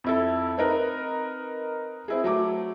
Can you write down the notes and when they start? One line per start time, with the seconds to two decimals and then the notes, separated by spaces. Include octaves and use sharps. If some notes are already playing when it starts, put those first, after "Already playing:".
0.04 F2 E4 A4
0.58 C4 D#4 A#4 B4
2.08 C4 E4 G#4
2.24 F#3 A3 D6